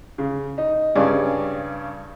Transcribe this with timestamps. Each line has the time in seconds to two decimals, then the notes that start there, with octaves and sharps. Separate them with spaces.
0.18 C#3
0.58 D#4
0.95 G2 C#3 C#4 D5